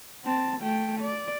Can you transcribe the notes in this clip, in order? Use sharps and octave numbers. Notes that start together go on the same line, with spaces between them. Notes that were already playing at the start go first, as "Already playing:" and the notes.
C4 A5
A3 G5
D5